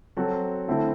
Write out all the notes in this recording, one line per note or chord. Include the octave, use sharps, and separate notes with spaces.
F#3 C4 F#4 A4
D3 A3 C4 E4 A4